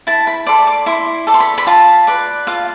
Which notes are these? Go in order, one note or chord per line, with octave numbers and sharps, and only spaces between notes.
E4 A5
B5
A4 D5 C6
D6
E4 C6
A4 D5
C6
B5
B5
F4 A5
B4 D5
F4 F5